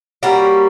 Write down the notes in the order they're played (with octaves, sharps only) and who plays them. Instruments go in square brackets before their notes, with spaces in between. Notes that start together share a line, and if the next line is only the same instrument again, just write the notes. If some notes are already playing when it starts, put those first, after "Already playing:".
[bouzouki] G3 A#3 C#4 F#4